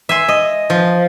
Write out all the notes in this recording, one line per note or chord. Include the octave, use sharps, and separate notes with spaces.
E5 G#5 C6
D#5
F3